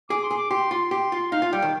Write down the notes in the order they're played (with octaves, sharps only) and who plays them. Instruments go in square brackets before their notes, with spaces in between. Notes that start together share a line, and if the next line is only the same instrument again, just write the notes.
[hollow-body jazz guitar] G#4 [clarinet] D6
[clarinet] C6
[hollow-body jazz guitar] G#4
[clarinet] D6
[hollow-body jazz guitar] G4 [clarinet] C6
[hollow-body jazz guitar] F4 [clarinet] C6
[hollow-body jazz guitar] G4
F4
[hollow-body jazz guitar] D#4 [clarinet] F5
[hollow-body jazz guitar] F4
[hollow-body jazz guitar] G3 [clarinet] G5
[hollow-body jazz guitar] D#3